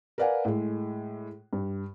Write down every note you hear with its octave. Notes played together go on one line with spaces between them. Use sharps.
A#4 B4 D5 F5 F#5 G#5
A2 G#3
G2